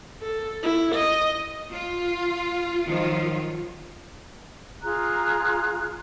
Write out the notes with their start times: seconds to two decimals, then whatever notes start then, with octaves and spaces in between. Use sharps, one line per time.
0.22 A4
0.63 E4
0.95 D#5
1.72 F4
2.87 D#3 F3 F#3 F4
4.84 F4 G#4 A#5 F#6